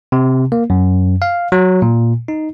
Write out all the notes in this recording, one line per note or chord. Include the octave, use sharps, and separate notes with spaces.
C3
A#3
F#2
F5
F#3
A#2
D#4